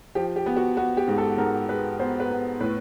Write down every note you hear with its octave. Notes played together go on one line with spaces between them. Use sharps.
F3 G4
G4
B3
F#4
B3 F#4
G4
G#2
A4
G#2 A#4
G#3 B4
B3 C5
B4
B3
A2 B4